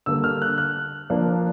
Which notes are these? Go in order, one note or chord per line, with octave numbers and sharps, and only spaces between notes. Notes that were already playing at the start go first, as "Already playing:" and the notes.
D3 G3 A#3 E6
F6
F#6
F#6
F3 A#3 D4